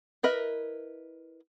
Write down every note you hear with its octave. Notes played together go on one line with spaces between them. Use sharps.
E4 A#4 B4 D#5 E5